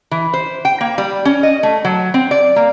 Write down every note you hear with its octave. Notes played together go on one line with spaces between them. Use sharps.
E3
C5
G5
A#3
G3
C#4
D#5
A3
F#3
C4
D5
A#3